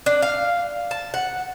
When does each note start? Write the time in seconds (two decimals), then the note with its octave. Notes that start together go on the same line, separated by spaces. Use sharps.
0.06 D4
0.22 F5
0.91 A5
1.14 F#5